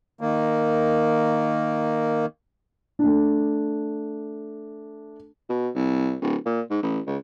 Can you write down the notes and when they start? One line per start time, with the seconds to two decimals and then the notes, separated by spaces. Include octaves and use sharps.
0.21 D#3 A#3
2.99 A3 D4
5.49 B2
5.75 C2
6.22 D1
6.46 A#2
6.70 G#2
6.82 A1
7.07 C#2